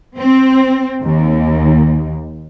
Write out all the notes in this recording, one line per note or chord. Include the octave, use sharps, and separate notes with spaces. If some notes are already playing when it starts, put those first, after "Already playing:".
C4
D#2